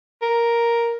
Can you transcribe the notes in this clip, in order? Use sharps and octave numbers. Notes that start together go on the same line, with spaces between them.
A#4